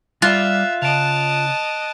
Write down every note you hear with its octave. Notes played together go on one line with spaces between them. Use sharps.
G3 F4 D5 E5 F#6
C#3 D#5 A5 D7 F7